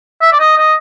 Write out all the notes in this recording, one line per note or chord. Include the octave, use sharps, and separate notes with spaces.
E5
D5
D#5
D#5